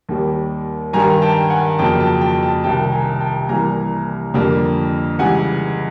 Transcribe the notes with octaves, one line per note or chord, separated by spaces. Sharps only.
D#2 D#3 G3
G2 D#3 G3 G#5 A#5
G5 A5
F#5 G#5
F2 C#3 F#3 A#3 G5 A5
G5 A5
G5 A5
G5 A5
C2 C3 D#3 G5 A5
G#5 A#5
G5 A5
C2 C3 E3 G3 A#3 G#5 A#5
F2 D3 G3 A#3
C#2 C#3 E3 G3 F#5 G#5